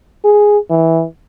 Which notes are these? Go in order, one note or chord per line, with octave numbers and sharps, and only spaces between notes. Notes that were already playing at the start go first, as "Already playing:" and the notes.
G#4
E3